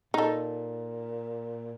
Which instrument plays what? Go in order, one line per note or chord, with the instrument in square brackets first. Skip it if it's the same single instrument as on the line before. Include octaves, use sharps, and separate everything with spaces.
[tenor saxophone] A#2 [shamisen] D#4 A4